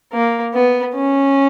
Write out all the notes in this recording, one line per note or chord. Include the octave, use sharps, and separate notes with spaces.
A#3
B3
C#4